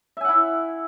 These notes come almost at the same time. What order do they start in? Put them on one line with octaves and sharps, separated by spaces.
E5 G#5 F#5 E4